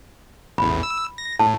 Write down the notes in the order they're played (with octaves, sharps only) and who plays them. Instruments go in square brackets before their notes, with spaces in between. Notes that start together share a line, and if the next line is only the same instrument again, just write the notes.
[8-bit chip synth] A1 E2 [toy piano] B5
[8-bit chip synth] E6
A#6
[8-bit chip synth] A2 [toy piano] A5